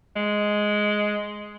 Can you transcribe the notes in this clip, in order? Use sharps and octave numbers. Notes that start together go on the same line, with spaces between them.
G#3